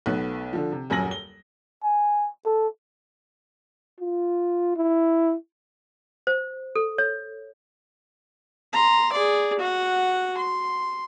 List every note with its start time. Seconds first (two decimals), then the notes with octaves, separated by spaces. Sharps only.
0.06 B1 A3 B3 F#6
0.53 D3 F3
0.72 C3
0.90 D#1 F#2 G#5 A#6 F#7
1.11 G7
1.84 G#5
2.45 A4
4.00 F4
4.77 E4
6.27 C5
6.76 A4
6.98 C#5
8.73 A#5 C6
9.13 G#4 D5
9.60 F#4 F#5
10.38 C6